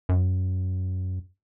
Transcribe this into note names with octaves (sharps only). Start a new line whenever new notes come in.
F#2